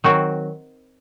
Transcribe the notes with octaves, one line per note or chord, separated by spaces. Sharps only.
D#3 F#3 C4 F#4